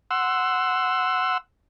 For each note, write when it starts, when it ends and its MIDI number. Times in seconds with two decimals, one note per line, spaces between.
0.11 1.38 78
0.11 1.38 84
0.11 1.38 88